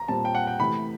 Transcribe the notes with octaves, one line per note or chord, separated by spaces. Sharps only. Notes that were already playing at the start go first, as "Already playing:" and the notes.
Already playing: A#5
A#2 G3 C4 A5
G5
F#5
G5
C3 E3 A3 B5